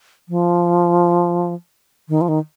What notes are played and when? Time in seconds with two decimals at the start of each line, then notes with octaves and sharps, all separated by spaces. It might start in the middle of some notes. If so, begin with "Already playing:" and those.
0.29 F3
2.09 D#3
2.21 F3
2.28 D#3